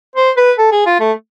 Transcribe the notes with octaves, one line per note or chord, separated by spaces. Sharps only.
C5
B4
A4
G#4
F4
A3